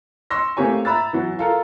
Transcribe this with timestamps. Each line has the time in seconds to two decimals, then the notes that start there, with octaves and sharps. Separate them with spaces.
0.31 C6 C#6 E6 A#6
0.57 A3 A#3 C4 G4 C#5 G#5
0.85 E5 A#5 B5 E6 A6
1.13 E3 F#3
1.39 F4 A4 A#4